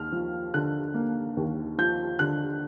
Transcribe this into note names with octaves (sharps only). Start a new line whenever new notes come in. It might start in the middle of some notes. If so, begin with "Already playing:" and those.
Already playing: D#2 F6
F3
D3 F#6
A#3
D#2
F3 G6
D3 F#6